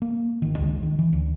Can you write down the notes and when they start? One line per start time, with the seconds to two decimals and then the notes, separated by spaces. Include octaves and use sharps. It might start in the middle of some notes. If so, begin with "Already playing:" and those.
0.02 A#3
0.42 G1 D#3
0.58 C#2 D3 G#3
0.83 D#3
0.99 E3
1.13 D2